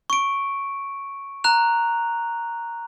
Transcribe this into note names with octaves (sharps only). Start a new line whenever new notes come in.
C#6 D7
A#5 F#6 F7